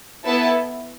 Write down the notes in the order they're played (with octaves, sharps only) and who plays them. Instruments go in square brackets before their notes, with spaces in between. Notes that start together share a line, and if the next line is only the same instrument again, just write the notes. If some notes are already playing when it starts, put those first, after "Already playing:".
[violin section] B3 E4 A4 A5